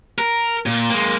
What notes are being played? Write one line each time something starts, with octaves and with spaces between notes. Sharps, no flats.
A#4
A#2
G#3 A#3